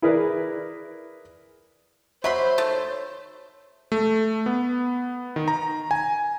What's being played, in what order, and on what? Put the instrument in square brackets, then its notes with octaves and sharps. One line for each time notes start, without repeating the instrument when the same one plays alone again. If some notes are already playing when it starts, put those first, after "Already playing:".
[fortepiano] E4 G#4 A#4 B4 D5
[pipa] F#3 B5 C6 [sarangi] C5 [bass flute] C#5 [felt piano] E5
[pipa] D#3 A3
[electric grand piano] A3
B3
D#3
A#5
G#5